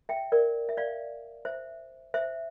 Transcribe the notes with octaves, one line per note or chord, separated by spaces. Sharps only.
E5 G5
A#4 D5
E5
D5 F5
C5 E5
C5 E5